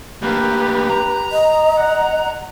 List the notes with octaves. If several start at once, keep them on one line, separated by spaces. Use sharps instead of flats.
D2 A#3 G4 B4
A#5
D#5
F#5